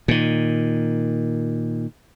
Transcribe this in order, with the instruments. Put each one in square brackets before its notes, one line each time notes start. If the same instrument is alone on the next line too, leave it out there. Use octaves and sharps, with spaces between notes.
[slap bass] A#2 D#3